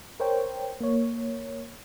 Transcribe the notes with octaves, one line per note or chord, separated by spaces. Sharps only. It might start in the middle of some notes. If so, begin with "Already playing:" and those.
A#4 C5 C#5 G5
A#3 C#5